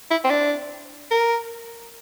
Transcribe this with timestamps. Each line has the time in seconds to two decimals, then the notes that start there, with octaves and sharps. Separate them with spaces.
0.11 E4
0.24 C4
0.30 D4
1.11 A#4